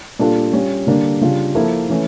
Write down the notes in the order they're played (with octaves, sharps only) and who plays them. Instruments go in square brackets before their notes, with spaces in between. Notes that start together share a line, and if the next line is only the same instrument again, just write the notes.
[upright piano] A#2 G3 D4 F4 A4
G3 C#4 F4
D3 G3 A#3 D4
C#3 G3 D4 F4
F3 A#3 E4 A4
E3 A3 C#4